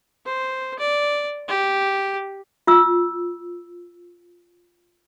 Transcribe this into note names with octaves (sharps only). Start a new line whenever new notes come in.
C5
D5
G4
F4 E6